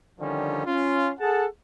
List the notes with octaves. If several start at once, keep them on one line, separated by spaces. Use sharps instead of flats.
D3 D#3 F3 G3 C#4
C#4 F4
G#4 A4 F#5 A5